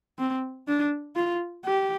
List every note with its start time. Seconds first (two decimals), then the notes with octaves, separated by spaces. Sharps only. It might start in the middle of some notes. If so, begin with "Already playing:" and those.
0.19 C4
0.68 D4
1.16 F4
1.65 G4